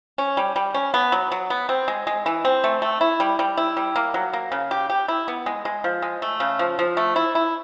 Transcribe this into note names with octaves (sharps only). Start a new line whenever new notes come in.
C#4
G3
G3
C#4
B3
F#3
F#3
B3
C4
G#3
G#3
E3
C4
A3
A3
E4
G3
G3
E4
G3
A#3
F#3
A#3
C#3
G4
G4
E4
B3
G#3
G#3
F3
G#3
A3
C#3
F3
F3
A3
E4
E4